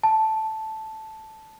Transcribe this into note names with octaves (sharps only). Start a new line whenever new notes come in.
A5